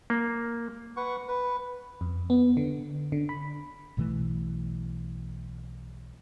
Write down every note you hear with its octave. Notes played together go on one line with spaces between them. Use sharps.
A#3
B4 F#5 C#6
B4
F2
B3
D3
D3
B5
B1 B2 E3 A3